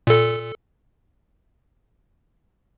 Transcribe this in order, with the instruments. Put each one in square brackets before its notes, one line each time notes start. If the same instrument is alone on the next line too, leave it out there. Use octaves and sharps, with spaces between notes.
[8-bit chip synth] A#2 A4